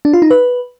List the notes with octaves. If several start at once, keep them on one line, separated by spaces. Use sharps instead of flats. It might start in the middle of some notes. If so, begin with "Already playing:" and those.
D4
F4
D#4
B4